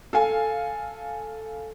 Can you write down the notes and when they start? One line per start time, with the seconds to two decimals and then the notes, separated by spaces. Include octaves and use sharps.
0.13 A4 F5 G#5